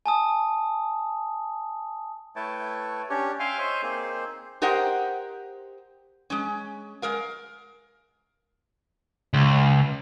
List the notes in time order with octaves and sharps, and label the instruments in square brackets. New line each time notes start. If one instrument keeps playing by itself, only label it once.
[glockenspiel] G#5 A5 D#6
[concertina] A3 E4 B4 C#5 G5 A5
C#4 D4 G4 C#5
E5 F5 G5 G#5 C6 F6
C5 C#5 D#5 E5 C6
A#3 C4 D#4 G#4 C5
[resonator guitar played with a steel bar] G4 A#4 C5 D#5 F#5 G5
G#3 C#4
G#3 A#4 F5
[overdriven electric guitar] C#2